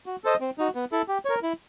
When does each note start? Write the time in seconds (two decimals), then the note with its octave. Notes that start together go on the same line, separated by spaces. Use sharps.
0.06 F#4
0.24 A4 C5 D#5
0.40 C4
0.58 D#4 F#4
0.75 B3
0.92 E4 A4
1.08 G4
1.25 A#4 C#5
1.43 E4